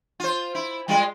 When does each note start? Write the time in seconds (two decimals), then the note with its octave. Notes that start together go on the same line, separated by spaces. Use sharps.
0.20 F4 C5
0.55 E4
0.88 G3 G#3 F4